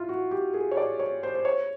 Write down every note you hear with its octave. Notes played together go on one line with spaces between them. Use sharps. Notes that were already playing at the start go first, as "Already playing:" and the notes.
Already playing: E4 F4
F#4
G4
G#4
C#5
D5
C#5
C5
C5
C#5